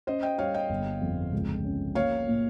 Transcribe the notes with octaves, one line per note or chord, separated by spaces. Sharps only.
C#4 C5 D#5
D#5 G5
G3 C#5 F5
D#5 G5
G1
F2
C#2
C#4
A#3 C#5 F5
A#2